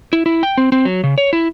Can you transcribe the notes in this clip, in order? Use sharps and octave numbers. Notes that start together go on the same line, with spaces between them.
E4
E4
G5
C4
C4
F#3
C#3
C#5
E4